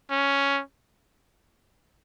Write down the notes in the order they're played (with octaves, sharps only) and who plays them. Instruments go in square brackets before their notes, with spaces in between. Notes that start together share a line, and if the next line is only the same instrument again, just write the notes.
[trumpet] C#4